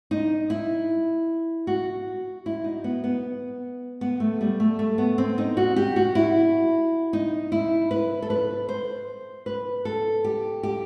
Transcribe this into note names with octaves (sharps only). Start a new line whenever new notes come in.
D#4
E4
F#4
E4
D#4
B3
B3
B3
A3
G3
A3
A3
B3
C4
D#4
F#4
G4
F#4
E4
D#4
E4
B4
A4
B4
C5
B4
A4
G4
G4